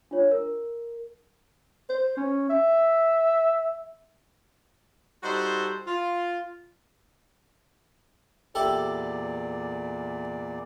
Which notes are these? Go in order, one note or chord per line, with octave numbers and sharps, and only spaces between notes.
D4 F4 C#5
A#4
C5
C#4
E5
G3 D#4 F#4 A4 C5
F4
E2 A#2 E4 G4 A4 D5